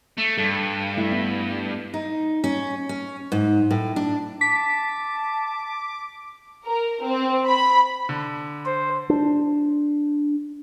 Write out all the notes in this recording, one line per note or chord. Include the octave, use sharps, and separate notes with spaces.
A3
G2 A4
A3 E4 E5
B3
D#4
C#4
C#4
G#2
A2
D4
A5 D6 B6
A#4
C4
B5
D3
C5
D4